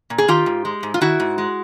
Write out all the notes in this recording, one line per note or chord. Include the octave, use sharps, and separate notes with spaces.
A#2
G#4
D#3 F4 G4
G#2
G#3
G#2
F4
D#3 E4 F#4
G#2
G#3